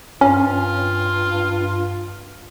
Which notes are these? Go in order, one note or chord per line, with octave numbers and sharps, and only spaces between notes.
G2 C#4 F4